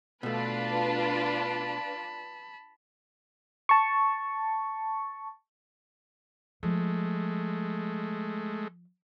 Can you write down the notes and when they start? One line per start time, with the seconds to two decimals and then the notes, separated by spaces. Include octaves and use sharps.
0.23 B2 A3 D4 F4 B4 A5 B5
3.69 A5 C#6
6.63 F3 G#3 A3